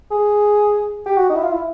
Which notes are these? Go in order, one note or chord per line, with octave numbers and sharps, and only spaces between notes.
G#4
G4
F#4
D#4
E4
F4
E4